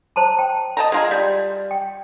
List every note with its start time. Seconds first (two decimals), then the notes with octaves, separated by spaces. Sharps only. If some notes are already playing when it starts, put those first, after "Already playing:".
0.16 C5 A5 A#5
0.39 G5
0.77 D#5 A5 A#5
0.92 G#3 F4 G#4
1.11 G3
1.71 G5